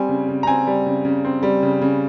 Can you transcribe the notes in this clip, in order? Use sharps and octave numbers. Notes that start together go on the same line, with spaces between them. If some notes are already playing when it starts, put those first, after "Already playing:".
Already playing: G3 C4 G#5
C#3
C#3
A#5
C4 G#5
G3
C#3
C#3
C4
G3
C#3
C#3